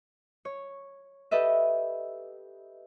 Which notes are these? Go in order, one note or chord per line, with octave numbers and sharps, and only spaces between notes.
C#5
G4 A4 B4 D#5 E5